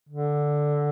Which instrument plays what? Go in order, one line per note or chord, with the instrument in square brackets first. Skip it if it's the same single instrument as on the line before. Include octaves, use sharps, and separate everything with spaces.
[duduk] D3